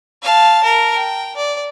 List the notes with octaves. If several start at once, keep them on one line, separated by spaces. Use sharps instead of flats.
F5 A5
A#4
G5
D5